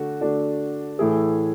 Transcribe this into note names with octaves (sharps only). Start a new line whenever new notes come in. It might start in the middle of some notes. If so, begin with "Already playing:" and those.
Already playing: D3 A3 F#4
D3 A3 D4 F#4
A2 E3 A3 E4 G#4